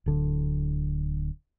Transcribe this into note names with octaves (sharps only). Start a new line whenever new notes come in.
D1 D3